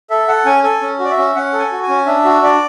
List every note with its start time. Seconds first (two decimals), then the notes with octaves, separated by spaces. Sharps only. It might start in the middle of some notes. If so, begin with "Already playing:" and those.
0.10 A4 E5
0.28 A4 F#5
0.45 C#4 G#5
0.63 A4 G#5
0.81 C#4
0.99 F#4
1.04 D5
1.11 E5
1.17 C#4
1.35 C#4 F#5
1.53 A4
1.59 G#5
1.72 F#4
1.83 G#5
1.89 C#4
2.06 D4 E5
2.24 F#4
2.42 D4 D5